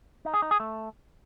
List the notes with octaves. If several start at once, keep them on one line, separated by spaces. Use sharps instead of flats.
D#4
G#4
D#4
G#4
A3